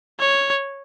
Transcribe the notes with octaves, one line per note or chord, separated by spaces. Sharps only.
C#5